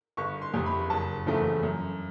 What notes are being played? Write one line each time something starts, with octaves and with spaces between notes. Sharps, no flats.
G1 C#6
C6
F2 C3
B5
F#1 A5
E2 C#3 F3 A3
F#2